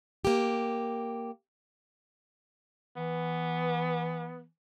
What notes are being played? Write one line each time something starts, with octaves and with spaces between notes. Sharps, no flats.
A#3 G4
E3 B3